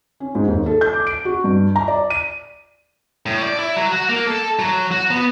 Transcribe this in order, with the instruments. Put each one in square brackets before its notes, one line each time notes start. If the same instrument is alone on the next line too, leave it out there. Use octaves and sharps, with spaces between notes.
[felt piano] C#4
G#2
D#2
A4
G6
D6
D7
F#4
G2
A#5
D5
D#7
[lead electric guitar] A2
D5
E4
F#3
F#4
A#3
A4
F#3
F#4
B3